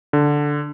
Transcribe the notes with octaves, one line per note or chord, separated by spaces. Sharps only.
D3